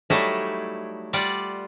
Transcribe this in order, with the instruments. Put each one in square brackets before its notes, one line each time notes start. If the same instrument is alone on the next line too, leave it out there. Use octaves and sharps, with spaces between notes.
[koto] F#3 G3 A3 D#4 E4
G3 F4 D5 F#5